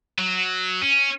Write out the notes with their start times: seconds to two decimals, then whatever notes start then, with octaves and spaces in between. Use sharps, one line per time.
0.19 F#3
0.82 C#4